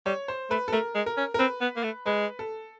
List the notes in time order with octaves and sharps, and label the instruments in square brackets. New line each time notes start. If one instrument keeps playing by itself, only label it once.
[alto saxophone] G3 [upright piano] C#5
[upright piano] C5
[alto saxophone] A3 [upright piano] B4
[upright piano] A4
[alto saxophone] A3 [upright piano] A#4
[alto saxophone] G#3
[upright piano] A#4
[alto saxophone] C#4
[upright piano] A#4
[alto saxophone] C4 [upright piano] B4
[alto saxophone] B3
A#3
A3
[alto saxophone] G#3 [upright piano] B4
[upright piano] A4